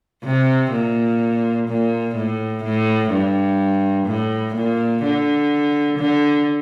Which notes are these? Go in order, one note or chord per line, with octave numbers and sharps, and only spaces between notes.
C3
A#2
A#2
A2
A2
G2
A2
A#2
D3
D3